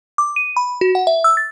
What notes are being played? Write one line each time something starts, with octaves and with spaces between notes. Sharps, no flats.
D6
D#7
B5
F#4
F#5
E5
E6
A6